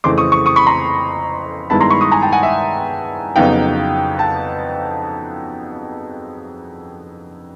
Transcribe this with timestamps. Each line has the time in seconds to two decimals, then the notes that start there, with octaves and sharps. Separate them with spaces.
0.04 F2 C#3 E3 A3 C4 C6 D6
0.18 C#6 D#6
0.32 C#6 D#6
0.46 C#6 D#6
0.56 B5 C#6
0.66 A#5 C6
1.70 G2 D#3 G#3 B3 E4 A5 B5
1.80 A#5 C6
1.90 B5 C#6
2.01 C#6 D#6
2.12 G#5 A#5
2.22 G5 A5
2.32 F#5 G#5
2.43 E5 F#5
3.36 F2 C#3 F#3 B3 D#4 F5 G5
4.19 G5 A5